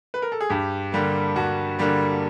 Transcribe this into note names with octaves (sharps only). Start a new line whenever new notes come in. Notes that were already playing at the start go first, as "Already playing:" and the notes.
B4
A#4
A4
G#4
G2 G4
D3 G3 A#3
G2 F#4
D3 G3 A#3